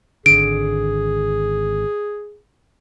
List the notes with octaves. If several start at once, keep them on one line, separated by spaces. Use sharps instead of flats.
G#1 D3 G#4 D7